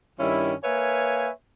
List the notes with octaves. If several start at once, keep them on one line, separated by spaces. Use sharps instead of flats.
G2 D#3 G3 C#4 E4
A#3 B4 C#5 E5 F5 G#5